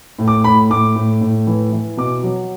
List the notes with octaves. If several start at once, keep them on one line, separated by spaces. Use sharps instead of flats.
A2
D6
A2 B5
A2 D6
A2
A2
E3
E3
B2 D6
F#3